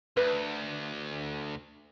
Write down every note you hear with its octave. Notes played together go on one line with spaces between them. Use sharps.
D2 B4